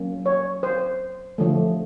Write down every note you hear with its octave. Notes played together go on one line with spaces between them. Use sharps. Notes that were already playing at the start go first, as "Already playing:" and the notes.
Already playing: F#3 A#3 C#4
C#5
C5
D3 F3 A3